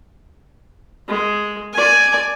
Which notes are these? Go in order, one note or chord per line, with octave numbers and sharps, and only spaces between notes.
G#3
D5 G#5